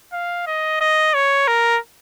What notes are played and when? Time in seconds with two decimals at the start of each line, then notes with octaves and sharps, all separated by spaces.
0.13 F5
0.47 D#5
0.81 D#5
1.15 C#5
1.48 A#4